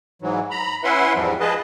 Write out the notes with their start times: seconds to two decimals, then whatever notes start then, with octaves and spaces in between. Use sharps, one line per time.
0.22 G#2 E3 F#3
0.51 A#5 B5
0.84 C#4 E4 B4 E5 F#5 C6
1.15 E2 G#2 F3 G3 C4
1.40 F3 G#3 G#4 B4 D#5 A5